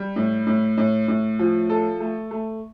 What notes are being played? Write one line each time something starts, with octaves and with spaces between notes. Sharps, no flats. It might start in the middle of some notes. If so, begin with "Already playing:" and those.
Already playing: G3
A2
A2
A2
A2
F3
A4
A3
A3